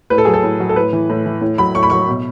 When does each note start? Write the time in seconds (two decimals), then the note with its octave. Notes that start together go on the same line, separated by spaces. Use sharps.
0.10 A2 B4
0.18 A4
0.25 F#3 G#4
0.34 A4
0.43 A2
0.60 F#3
0.69 A4
0.76 A2 B4
0.93 E3
1.10 A2
1.26 E3
1.41 A2
1.58 F#3 B5
1.75 A2 C#6
1.83 B5
1.90 F#3 C#6
2.08 B2